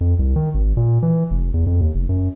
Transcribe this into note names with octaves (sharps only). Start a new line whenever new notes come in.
F2
C2
D#3
G#1
A#2
E3
F1
E2
F2
D#2
F1
F#2